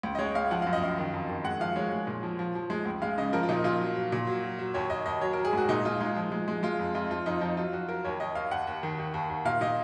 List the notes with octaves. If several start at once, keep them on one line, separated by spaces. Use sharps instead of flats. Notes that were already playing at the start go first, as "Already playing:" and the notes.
C#2
D#5
G#3 C#5
C#2 F5
F3 F#5
F#2 F5
D#5
F#2 F5
D#3
F2
D#3
G#3 F#5
F3 F5
G#3 C#5
G#3
A#2
F3
F3
F3
G#3
C#2
G#3 F5
C#3 D#5
F3 A#4
F4
A#2 D#4
A#2 F4
F#3
F#3
A#2
F#3
F#3
F#3
D#2 C#5
D#2 D#5
D#2 D#5
F#3 C#5
A#4
F#3
G#4
G#2 F#4
A#2 D#4
A#2 F4
G#3 D#4
F3
G#3
G#3
G#3 F4
F2
F2 F4
F3 F4
F2 D#4
F3 D#4
F#3 F4
F#3 F#4
F#3 A#4
D#2 C#5
D#2 D#5
D#2 F5
D#2 F#5
D#2
D#3
D#2
D#2
D#2
A#2 F5
A#2 D#5